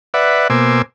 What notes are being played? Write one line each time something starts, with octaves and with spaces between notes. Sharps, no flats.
B4 D5 E5 F#5
B2 A#3 C5 G#5 D6 E6